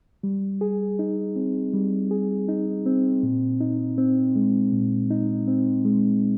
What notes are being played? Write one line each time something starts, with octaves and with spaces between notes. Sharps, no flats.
G3
G#4
D#4
C4
G3
G#4
D#4
C4
A#2
D#4
C4
G#3
A#2
D#4
C4
G#3